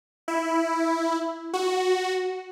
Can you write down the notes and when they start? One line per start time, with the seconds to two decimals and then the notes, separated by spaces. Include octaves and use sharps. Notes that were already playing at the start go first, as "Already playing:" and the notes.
0.28 E4
1.54 F#4